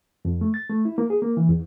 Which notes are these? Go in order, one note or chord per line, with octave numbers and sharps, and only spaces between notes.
F2
A3
A6
A3
E4
A#3
G#4
A#3
E3
E2